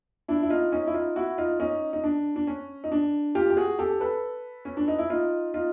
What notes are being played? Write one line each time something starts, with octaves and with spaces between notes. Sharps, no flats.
D4 E4
E4
D#4 F4
C#4 D#4
E4
D#4 F4
E4 F#4
D#4 F4
C#4 D#4
D#4
D4
D4
C#4
D#4
D4
F4 G4
G4
F#4 G#4
G4 A4
A4 B4
C#4
D4
D#4
E4
D#4 F4
D#4 F4